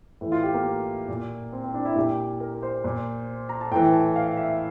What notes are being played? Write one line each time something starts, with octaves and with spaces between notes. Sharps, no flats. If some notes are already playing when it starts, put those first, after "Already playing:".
A2 E3
F4
G4
A#3
A#2
C4
C4
D4
E4
A#2 G4
A#4
C5
A#2
A#5
A5
A2 E3 G5
A5
F5
E5